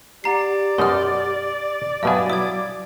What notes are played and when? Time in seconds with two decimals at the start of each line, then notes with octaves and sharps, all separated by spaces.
0.24 G4 D5 F#5 A#5 C7
0.78 F#2 B2 D#4 C6 F6
2.03 G2 B2 F#3 E5 F5 G#5
2.30 E4 D#6 G#6